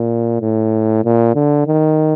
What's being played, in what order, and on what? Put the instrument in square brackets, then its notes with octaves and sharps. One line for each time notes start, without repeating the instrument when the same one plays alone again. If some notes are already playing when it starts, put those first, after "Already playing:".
Already playing: [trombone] A#2
A2
A#2
D3
D#3